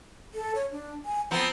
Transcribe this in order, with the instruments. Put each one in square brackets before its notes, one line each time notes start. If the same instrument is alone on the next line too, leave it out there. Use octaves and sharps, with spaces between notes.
[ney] A4
C#5
D4
G#5
[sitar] F3 B3 C4 [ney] A#5